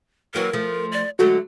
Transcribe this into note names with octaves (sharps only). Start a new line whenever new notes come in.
E3 F#3 A#3 A#4
F3 A3
D5
D3 F#3 G#3 A3 F#4